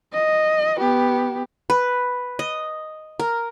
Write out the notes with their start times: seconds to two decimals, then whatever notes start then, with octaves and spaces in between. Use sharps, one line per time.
0.13 D#5
0.77 B3 G4
1.70 B4
2.39 D#5
3.20 A#4